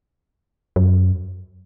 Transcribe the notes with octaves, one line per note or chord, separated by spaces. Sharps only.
F#2